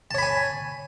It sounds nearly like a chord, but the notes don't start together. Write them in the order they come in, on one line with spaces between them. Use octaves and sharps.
A5 C#5 B5 G#5